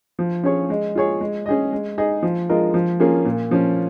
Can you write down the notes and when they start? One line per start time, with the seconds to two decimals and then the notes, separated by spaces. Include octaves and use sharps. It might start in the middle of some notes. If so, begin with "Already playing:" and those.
0.19 F3
0.44 C#4 G#4 C#5
0.70 G#3
0.95 F4 G#4 C#5
1.21 G#3
1.46 C#4 G#4 D#5
1.73 G#3
1.98 D#4 G#4 D#5
2.23 F3
2.49 G#3 F4 A#4 D#5
2.74 F3
3.00 A#3 C#4 F4 G#4
3.25 A#2
3.51 F3 C#4